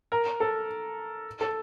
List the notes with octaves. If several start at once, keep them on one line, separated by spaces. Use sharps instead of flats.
A#4
A4
A4